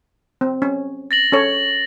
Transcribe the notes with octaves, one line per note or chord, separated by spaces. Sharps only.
C4
C#4
A6 A#6 F#7
C#4 A4 C#5